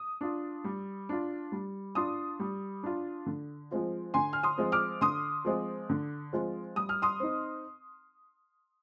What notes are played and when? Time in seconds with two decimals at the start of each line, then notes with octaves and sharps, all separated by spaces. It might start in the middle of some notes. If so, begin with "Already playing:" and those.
Already playing: D#6
0.21 D4 F4
0.64 G3
1.09 D4 F4
1.52 G3
1.95 D4 F4 C6 D#6
2.40 G3
2.83 D4 F4
3.26 D3
3.71 F3 G#3 C4 F4
4.14 D3 G#5 C6
4.33 F6
4.43 C6 D#6
4.58 F3 G#3 C4 F4
4.72 D6 F6
5.01 D3 C6 D#6
5.45 F3 G#3 C4 F4
5.90 D3
6.33 F3 G#3 C4 F4
6.76 G3 D#6
6.89 F6
7.02 C6 D#6
7.20 C4 D#4